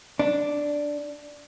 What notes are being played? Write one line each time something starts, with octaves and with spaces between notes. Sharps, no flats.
D4